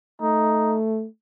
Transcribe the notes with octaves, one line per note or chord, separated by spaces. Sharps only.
A3 D#4